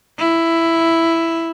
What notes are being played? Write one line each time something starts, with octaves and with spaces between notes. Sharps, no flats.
E4